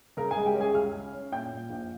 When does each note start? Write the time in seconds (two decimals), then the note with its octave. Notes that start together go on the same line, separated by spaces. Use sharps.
0.17 C#3 A#4 A#5
0.31 G#4 G#5
0.37 G#3
0.46 G4 G5
0.55 C#4
0.61 G#4 G#5
0.74 C#2 F5 F6
0.94 C#4
1.13 C#4
1.32 A#2 G5 G6
1.52 A#2
1.70 A#1